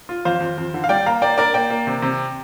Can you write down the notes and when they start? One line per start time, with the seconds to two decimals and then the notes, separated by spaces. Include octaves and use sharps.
0.09 F4
0.25 F2 C5 F5
0.41 F2
0.58 F2
0.74 D3
0.84 F5
0.89 G3 D5 G5
1.06 A#3 F5 A#5
1.22 A#3 D5 G5
1.38 D4 A#4 D5
1.54 A#3 D5 G5
1.70 A#3
1.87 C3
2.02 C3